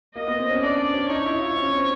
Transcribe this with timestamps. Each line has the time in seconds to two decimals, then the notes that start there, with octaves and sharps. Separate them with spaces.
0.15 A#3 D#5
0.27 B3
0.39 C4
0.50 C#4
0.63 D4 D5
0.94 C#4
1.10 D#4 C#5
1.26 E4
1.41 F4
1.57 C#4
1.73 C4